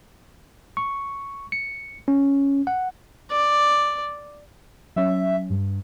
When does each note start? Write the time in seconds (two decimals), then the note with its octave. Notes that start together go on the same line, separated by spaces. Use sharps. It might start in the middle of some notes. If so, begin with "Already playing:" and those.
0.77 C#6
1.52 C#7
2.08 C#4
2.67 F#5
3.31 D5
4.96 F#3 C#4 E5
5.50 G2